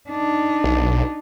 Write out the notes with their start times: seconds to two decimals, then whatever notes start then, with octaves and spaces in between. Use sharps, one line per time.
0.10 D4 D#4
0.64 B1